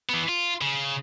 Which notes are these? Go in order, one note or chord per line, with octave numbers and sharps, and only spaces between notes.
E3 B3
F4
C#3